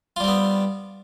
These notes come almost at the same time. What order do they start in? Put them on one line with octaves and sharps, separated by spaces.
F4 G3 C4 B3